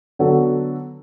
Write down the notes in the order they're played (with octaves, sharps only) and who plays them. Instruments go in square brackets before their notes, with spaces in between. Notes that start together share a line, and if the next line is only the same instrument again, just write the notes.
[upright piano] D3 F#3 B3 F#4 A4